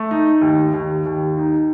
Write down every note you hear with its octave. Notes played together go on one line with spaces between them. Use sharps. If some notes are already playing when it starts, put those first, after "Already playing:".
Already playing: A3
D#4
D#2
D#2
D#2
D#4